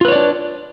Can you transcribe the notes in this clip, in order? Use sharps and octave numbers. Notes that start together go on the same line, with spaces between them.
D4 F4 B4 C#5 D5